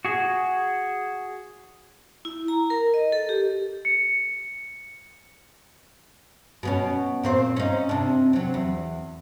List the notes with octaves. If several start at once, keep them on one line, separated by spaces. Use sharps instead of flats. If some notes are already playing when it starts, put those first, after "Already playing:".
F#4 G#4
E4
A#5
A#4
D#5
A4
G4
C#7
B2 B3 C#4
A#2 C4 C5
C#4 D#4
C3 D4
F#3 C4
E2